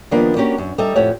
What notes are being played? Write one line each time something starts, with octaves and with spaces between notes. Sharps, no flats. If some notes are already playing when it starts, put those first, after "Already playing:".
D#3 F3 G3 A#3 B3 D4
A#3 C#4 D4 F#4 G4
F#2
G3 D#4 A4 D#5 E5
F2 A2 A3 G4 C#5 F#5